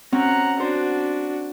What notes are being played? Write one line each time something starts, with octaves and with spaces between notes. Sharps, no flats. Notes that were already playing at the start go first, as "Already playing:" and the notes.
C4 C#4 F#4 F#5 A#5
D4 F#4 C5